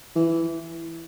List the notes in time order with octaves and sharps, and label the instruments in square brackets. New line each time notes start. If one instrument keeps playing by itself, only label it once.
[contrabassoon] E3